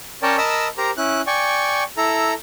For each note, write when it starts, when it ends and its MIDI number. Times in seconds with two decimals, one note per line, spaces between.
0.23 0.37 61
0.23 0.37 70
0.23 0.37 73
0.23 0.37 74
0.23 0.37 79
0.23 0.37 81
0.38 0.68 70
0.38 0.68 75
0.38 0.68 81
0.38 0.68 83
0.38 0.68 88
0.78 0.91 67
0.78 0.91 70
0.78 0.91 72
0.78 0.91 82
0.97 1.21 61
0.97 1.21 64
0.97 1.21 90
1.27 1.83 74
1.27 1.83 79
1.27 1.83 80
1.27 1.83 85
1.97 2.34 64
1.97 2.34 69
1.97 2.34 82